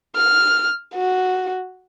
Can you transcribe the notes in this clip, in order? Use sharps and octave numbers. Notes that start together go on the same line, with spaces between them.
F6
F#4